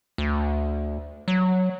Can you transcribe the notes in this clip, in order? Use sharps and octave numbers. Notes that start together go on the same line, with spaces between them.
D2
F#3